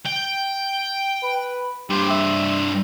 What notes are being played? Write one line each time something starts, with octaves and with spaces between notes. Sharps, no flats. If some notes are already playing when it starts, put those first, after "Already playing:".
G5
B4
G2 G4 C5
E5